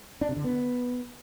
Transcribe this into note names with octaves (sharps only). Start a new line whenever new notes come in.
D4
C3
D3
B3